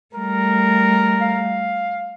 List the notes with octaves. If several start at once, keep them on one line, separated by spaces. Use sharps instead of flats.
G3 A3 A#4
F5